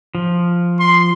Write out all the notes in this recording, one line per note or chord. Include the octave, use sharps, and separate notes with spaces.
F3
C6